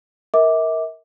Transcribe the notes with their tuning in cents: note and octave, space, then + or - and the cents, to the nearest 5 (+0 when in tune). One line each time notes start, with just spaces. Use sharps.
A#4 +0 E5 -40 D6 +0